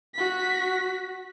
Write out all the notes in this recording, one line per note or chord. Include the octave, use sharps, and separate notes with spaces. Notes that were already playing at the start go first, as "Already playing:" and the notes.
F#4 B6